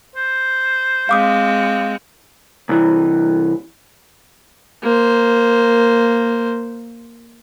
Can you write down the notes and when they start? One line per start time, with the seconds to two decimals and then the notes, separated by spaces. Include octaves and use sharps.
0.16 C5
1.09 G#3 C4 F5 D6 D#6
2.69 C2 E3
4.82 A#3 C5